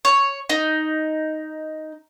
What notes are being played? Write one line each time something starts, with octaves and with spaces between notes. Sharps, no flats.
C#5
D#4